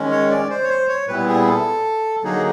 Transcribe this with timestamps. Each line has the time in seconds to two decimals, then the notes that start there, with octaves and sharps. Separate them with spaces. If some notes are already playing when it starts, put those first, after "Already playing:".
Already playing: D#3 G#3 C#4
0.12 C#5
0.30 D5
0.50 C5
0.64 C#5
0.69 C5
0.88 C#5
1.08 A#2 G3 B3 E4 B4
1.28 G#4
1.46 A4
2.24 D3 F#3 A#3 D#4 G#4